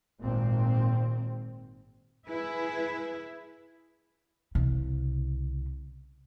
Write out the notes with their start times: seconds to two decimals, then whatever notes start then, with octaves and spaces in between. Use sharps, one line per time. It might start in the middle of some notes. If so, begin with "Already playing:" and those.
0.22 G#1 A#2 C4
2.27 E4 G#4 B4 E5
4.55 C2 C#3